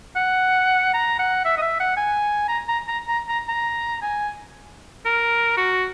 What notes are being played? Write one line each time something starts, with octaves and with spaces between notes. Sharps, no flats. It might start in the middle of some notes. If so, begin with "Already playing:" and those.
F#5
A#5
F#5
E5
D#5
E5
F#5
G#5
A#5
A#5
A#5
A#5
A#5
A#5
G#5
A#4
F#4